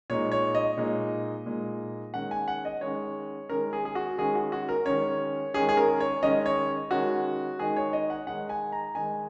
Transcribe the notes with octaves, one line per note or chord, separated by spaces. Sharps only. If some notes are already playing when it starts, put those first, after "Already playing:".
A#2 G#3 D#4 C#5
C#5
D#5
A#2 G#3 D#4
A#2 G#3 D#4
D#3 G#3 C#4 F#5
G#5
F#5
D#5
D#3 G#3 C#4 C#5
D#3 G#3 C#4 A#4
G#4
G#4
F#4
D#3 G#3 C#4 G#4
F#4
F#4
A#4
D#3 G#3 C#4 C#5
D#3 G#3 C#4 G#4
G#4
A#4
C#5
D#3 G#3 C#4 D#5
C#5
D#3 G#3 C#4 F#4
D#3 G#3 D#4 G#4
C#5
D#5
F#5
D#3 G#3 D#4 F#5
G#5
A#5
D#3 G#3 D#4 G#5